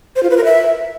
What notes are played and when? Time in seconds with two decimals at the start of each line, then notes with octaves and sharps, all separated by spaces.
0.16 C5
0.23 F4
0.30 B4
0.37 A#4
0.44 E5